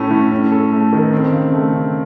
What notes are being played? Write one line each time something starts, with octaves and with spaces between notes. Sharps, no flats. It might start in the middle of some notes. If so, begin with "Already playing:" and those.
Already playing: A2 A3 C#4
A2
C#4
A4
A3
D#3
C4
C#3
A3
C#3